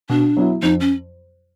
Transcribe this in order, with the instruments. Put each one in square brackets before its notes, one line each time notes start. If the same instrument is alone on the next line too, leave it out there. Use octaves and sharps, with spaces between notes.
[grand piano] B2 [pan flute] D4
[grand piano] F#3 B3 E4
[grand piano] F2 [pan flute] D#4
[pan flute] C#4